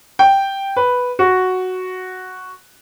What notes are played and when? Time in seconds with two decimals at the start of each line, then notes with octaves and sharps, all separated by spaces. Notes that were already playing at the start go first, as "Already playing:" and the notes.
0.19 G5
0.76 B4
1.19 F#4